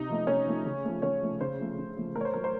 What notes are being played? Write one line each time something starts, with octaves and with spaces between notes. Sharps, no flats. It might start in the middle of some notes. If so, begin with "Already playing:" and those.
Already playing: C3 D#4 D#5
F3 A3
C3 C#4 C#5
F3 A3
C#3
F3 A3
C#3 C#4 C#5
F3 A3
C#3 C5
F3 A3
C#3
F3 A3
A2 A#4
C#5
C5
F#3 A3 A#4
C5